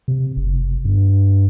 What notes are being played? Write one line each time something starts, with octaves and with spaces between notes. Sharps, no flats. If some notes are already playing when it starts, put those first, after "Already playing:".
C3
F#1
G2